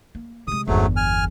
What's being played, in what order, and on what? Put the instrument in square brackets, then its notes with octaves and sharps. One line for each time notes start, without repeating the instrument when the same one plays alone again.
[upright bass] A#3
[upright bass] C3 G#3 [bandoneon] D#6
[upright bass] G1 E2 [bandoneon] G#2 F#3 A3
[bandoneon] G#5 F6